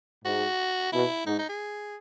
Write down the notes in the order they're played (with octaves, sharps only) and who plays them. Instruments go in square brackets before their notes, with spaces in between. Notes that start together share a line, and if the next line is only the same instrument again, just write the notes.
[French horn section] G#2 [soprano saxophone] F#4
[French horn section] B2 [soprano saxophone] E4
[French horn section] G#2 [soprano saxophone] D#4
[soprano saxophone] D#4
G#4